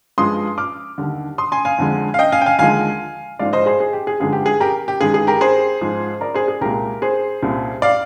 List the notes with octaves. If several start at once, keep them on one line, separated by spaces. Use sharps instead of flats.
G2 F3 G#3 C6 D#6
D6 F6
D#2 D3 G3
C6 D#6
G#5 C6
F5 G#5
F2 D3 F3 G#3
F5
D#5 G5
F5 G#5
G5
F5 G#5
D#2 D3 F3 G#3 F5 G#5
G#2 F3 G#3 D5 F5
C5 D#5
G#4 C5
G#4
G4
G#4
G2 D3 F3 G#3 G#4
G4
G#4
G4 A#4
G4
G2 D#3 G#3 G#4
G#4
G4 A#4
G#4 C5
G#2 F3 G#3
A#4 D5
G#4 C5
G#4
C2 A#2 G#3 G4 A#4
G#4 C5
C2 A#2 G3
D5 F5